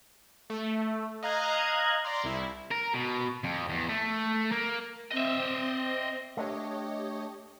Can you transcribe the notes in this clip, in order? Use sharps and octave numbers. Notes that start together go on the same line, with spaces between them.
A3
D#5 F5 A#5 F#6 G#6
D5 A#5 C6
C2 E4
A#4
B2
F2
E2
A3
A#3
C4 D#5 E5
A3 D4 G4 C#5 D#5